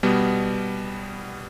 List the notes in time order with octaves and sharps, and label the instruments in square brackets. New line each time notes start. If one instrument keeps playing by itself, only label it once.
[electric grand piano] B2 G3 B3